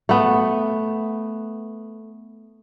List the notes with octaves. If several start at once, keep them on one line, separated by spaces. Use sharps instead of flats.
A3 B3